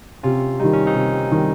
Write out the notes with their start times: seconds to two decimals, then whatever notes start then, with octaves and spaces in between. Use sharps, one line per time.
0.23 C3 C#4 F4
0.60 D#3 G3 D#4
0.73 C#4
0.86 C4 D#4
0.95 C3
1.31 D#3 G3